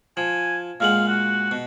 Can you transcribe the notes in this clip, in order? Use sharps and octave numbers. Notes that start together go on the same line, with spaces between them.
F3 G#5
A#2 G#3 F5 F#5
F#4
B2